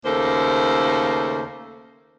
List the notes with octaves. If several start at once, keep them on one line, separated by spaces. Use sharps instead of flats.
D#2 C#3 A3 A#3 A4 C5